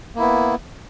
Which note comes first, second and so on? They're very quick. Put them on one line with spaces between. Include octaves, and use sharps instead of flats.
A#3 E4 B3